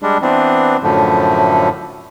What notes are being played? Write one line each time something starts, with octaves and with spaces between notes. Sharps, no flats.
G3 G#3 D4
E3 B3 C4 D4
F#2 A2 D3 F3 A3